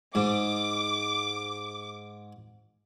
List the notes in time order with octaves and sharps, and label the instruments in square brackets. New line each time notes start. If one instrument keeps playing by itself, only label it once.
[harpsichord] G#2 [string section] D6